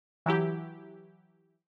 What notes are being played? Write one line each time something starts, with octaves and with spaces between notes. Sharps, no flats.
E3 F#3 E4 G4